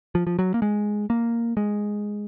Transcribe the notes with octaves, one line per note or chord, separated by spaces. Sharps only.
F3
F3
F#3
A#3
G#3
A#3
G#3